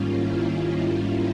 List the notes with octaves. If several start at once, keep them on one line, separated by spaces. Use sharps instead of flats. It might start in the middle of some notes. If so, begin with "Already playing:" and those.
Already playing: G#2 D#3 G3 A#3 C#4 F4
E4
E4
F4